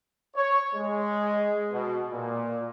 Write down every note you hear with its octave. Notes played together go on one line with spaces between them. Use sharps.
C#5
G#3
B2
A#2